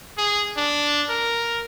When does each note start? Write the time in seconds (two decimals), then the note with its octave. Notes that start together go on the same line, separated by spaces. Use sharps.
0.18 G#4
0.57 D4
1.09 A#4